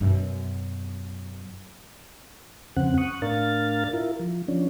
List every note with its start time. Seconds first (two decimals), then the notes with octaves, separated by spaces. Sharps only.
0.01 F#2 B2
2.77 F2 C#3 C4 F#5
2.98 C#6 D#6 F#6
3.22 A2 D4 A#4 F5 A6
3.93 E4 F4 A#4
4.20 F3
4.48 F3 C#4 D4